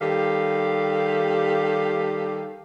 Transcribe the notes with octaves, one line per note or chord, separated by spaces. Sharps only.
D#3 G3 G4 A4 F5